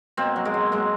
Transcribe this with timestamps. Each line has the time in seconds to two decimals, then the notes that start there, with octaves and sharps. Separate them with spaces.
0.17 B2 A#3 C4
0.36 F#3
0.45 G#3 A#3
0.54 F#3
0.72 F#3 G#3 A#3